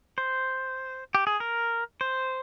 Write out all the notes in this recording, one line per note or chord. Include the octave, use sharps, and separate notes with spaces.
C5
G4
G#4
A#4
C5